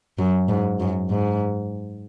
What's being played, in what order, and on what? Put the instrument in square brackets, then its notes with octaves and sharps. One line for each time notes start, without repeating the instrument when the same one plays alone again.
[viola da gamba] F#2
G#2
F#2
G#2